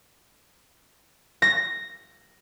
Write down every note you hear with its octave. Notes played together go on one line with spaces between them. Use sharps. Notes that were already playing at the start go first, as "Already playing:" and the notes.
A#6